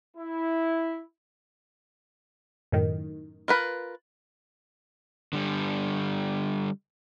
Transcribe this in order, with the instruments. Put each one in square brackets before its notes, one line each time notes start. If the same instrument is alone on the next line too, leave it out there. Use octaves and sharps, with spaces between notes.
[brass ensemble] E4
[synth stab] F#2 A2 D#3
[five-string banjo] F4 A#4 B4
[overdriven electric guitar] D3 G3